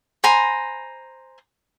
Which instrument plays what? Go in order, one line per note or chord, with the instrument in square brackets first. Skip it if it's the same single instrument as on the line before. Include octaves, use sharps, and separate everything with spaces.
[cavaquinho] C5 G#5 A#5 B5